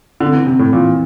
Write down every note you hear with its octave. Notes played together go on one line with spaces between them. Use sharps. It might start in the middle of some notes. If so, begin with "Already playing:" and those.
D3 C4
E3
C3 C4
A2
A#2 E3